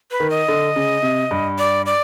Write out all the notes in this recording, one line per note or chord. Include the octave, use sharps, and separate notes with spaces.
B4
D#3
D#5
D3
C#3
C3
G2
D5
D5